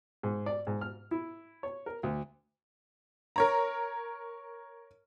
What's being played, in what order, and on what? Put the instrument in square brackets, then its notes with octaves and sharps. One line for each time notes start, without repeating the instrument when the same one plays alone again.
[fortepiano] G#2
D5
G#2
F6
E4
C#5
A#4
D2
[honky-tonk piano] A#4 C#5 A#5